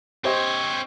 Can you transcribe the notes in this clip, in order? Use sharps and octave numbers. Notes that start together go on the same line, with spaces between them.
C4 G4 C5 C#5 D#5